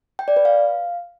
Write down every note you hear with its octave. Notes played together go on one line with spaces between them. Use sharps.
G5
D5
B4
F5